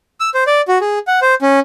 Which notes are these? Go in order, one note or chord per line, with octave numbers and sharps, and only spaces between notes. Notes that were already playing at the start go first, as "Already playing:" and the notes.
E6
C5
D5
F#4
G#4
F#5
C5
C#4